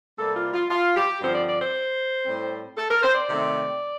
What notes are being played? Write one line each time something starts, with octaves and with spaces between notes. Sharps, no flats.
C3 G3 A#3 A4
F4
F4
F4
G4
G2 D3 F3 C4 C5
D5
D5
C5
A2 G3 C4
A4
A#4
C5
D5
C3 D#3 A3 C4